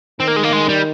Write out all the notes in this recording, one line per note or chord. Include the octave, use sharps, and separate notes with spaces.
D#3 C4
A#3
G#3
A#3
G#3
G3